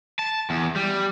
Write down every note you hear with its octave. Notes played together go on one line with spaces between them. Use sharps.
A5
E2
G3